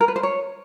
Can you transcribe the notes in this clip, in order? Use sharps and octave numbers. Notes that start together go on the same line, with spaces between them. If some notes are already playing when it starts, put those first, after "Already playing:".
A#4
B4
C5
C#5